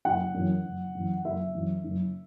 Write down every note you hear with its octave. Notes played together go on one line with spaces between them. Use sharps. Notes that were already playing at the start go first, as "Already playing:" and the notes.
F#1 F#5
F#2 E3
F#1
F#2 E3
F#1 E5
F#2 E3
F#1